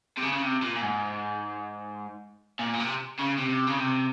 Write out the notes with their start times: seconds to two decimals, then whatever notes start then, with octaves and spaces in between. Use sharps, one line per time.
0.17 C3
0.22 C#3
0.33 C#3
0.42 C3
0.62 A#2
0.76 A#2
0.82 G#2
2.59 A#2
2.75 A#2
2.80 C3
3.19 C#3
3.39 C3
3.68 C#3
3.78 C3